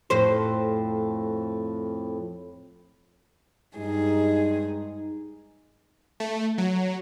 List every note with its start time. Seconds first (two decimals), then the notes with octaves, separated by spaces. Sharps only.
0.10 F2 A2 C5
3.76 G2 G#3 D#4 G#4
6.20 A3
6.58 F#3